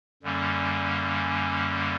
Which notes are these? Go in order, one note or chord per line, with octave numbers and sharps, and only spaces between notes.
F#2 D3 G3 A#3 C#4